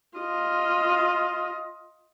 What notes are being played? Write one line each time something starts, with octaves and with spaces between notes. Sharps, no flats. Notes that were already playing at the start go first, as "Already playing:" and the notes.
F4 D#5